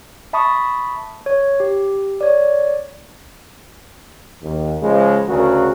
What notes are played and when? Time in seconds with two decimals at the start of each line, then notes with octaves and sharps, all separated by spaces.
0.33 E5 A5 B5 C#6 D#6
1.26 C#5
1.60 G4
2.21 C#5 D5
4.42 D#2
4.82 C#3 F3 G#3
5.29 D2 C#3 F#4 A#4